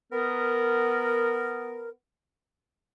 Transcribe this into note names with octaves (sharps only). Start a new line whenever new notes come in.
B3 A#4